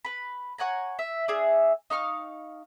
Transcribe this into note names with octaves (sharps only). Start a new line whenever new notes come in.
B4 B5
C#5 F#5 G#5 A#5
E5
D4 G#4 E5
D#4 F5 C#6 F6